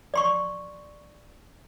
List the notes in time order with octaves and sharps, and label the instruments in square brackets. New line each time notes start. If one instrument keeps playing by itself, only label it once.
[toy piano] D5 C6 C#6